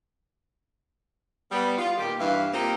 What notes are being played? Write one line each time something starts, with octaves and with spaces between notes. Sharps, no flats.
G3 B3
F4
A#2 D#3 G4
G2 E3 F5
A#3 C4 D#4 F4 G4